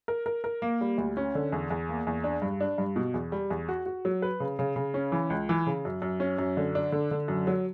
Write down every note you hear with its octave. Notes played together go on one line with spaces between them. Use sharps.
A#4
A#4
A#4
A#3
G3
D2
C#4
D3
E2
E2
A#3
E2
D4
G2
D4
G2
B2
E2
G3
E2
F#4
F#4
F#3
B4
C#3
C#3
C#3
C#4
E3
C#2
E3
C#3
F#2
F#2
C#4
F#2
D3
D4
D3
D3
F#2
F#3